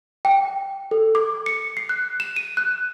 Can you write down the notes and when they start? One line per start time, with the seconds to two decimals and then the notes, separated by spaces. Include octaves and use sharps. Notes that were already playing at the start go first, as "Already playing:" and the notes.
0.25 G5
0.91 A4
1.15 D6
1.46 C#7
1.77 C7
1.89 F#6
2.20 E7
2.36 D#7
2.57 F#6